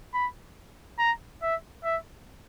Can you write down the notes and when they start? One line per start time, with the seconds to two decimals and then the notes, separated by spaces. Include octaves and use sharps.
0.14 B5
0.99 A#5
1.42 E5
1.84 E5